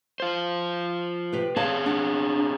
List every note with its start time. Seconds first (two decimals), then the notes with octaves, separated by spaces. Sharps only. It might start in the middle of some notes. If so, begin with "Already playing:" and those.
0.20 F4 C5
1.32 C3 G4 B4
1.57 C4 G#4 C#5 D5 F5 A5
1.86 D4 F#5